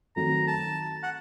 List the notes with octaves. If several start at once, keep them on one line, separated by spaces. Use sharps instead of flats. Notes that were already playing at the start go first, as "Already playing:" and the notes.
D#3 F#3 A3 C4 A#5
A5
F#5